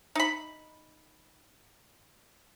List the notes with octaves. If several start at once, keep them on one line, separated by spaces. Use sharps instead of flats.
D#4 B5